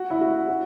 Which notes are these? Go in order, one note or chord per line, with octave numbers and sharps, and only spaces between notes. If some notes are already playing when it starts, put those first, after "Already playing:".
Already playing: F#4
E4
F#4
F#4